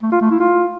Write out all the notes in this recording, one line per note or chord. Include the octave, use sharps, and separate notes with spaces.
A3
F4
A3
E4
F4